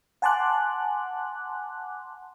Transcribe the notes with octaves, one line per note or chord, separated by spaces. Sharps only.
F#5 G#5 A5 C6 D6 F#6